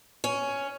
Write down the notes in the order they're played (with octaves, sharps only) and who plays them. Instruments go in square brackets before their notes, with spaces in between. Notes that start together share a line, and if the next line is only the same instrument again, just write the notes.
[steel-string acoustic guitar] C#4